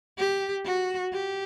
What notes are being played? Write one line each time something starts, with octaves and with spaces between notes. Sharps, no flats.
G4
F#4
G4